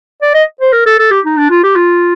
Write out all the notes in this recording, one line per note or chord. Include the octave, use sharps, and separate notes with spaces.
D5
D#5
C5
A#4
A4
A4
G4
D#4
D4
F4
G4
F4